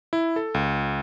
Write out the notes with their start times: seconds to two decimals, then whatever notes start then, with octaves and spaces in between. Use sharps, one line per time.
0.13 E4
0.36 A4
0.54 C#2